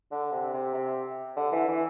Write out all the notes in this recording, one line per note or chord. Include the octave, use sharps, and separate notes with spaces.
D3
C3
C3
C3
D3
E3
E3